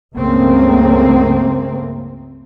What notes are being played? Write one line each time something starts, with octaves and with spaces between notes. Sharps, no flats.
C#2 G2 C#3 A3 A#3 C4